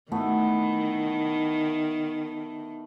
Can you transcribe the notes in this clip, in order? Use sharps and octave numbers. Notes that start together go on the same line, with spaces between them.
D#3 A3 B3 E4